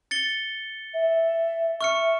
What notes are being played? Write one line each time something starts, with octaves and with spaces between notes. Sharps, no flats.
A6 C#7 G7
E5
E5 C#6 F6 C#7